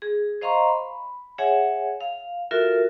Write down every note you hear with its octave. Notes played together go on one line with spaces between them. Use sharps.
G#4
C5 D#5 F5 A#5 C6 C#6
B5
G#4 C#5 E5 F#5 G#5
F5
F4 F#4 A4 A#4 E5